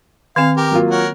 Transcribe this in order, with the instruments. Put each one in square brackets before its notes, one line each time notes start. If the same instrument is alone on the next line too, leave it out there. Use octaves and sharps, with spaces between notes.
[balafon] D#3 C4 [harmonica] F5
[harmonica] G4 A#4
[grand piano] F#3 A#3 F4
[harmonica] A#4 C#5 F#5